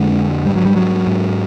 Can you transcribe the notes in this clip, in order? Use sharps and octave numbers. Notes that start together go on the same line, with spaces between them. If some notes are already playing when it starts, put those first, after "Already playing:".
Already playing: F2 D3 G#3
G#2 G3
F#3
G3
F#3
G#2